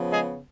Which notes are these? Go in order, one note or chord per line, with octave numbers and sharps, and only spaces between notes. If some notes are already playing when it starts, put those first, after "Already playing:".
Already playing: C#3 F3 B3
G#3 G#4